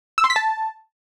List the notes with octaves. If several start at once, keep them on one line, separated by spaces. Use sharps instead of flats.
E6
C6
B6
A5